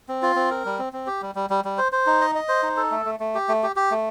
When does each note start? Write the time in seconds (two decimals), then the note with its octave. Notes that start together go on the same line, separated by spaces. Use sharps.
0.08 C4
0.23 F4
0.36 C4
0.51 A#4
0.65 G3
0.79 C4
0.93 C4
1.07 G4
1.22 G3
1.35 G3
1.50 G3
1.65 G3
1.78 C5
1.92 C5
2.06 D#4
2.21 D#5
2.35 D#5
2.48 C5
2.63 D#4
2.77 A4
2.91 A3
3.06 A3
3.20 A3
3.35 G4
3.49 A3
3.63 G4
3.76 G4
3.91 A3